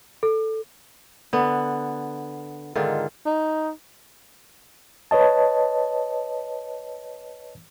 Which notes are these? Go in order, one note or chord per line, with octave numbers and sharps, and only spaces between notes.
A4
D3 B3
G#2 D3 D#3 F4
D#4
B4 C#5 D#5 A5